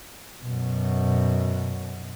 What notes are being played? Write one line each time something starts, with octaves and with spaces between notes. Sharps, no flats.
F#2 B2